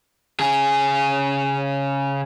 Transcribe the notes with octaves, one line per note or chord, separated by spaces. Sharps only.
C#3 G#4